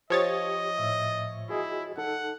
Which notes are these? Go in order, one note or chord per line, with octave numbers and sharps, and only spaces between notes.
F3 G4 C#5 D#5 D#6 A6
A2 E5
E4 F#4 G#4 D#5
D#4 A4 F#5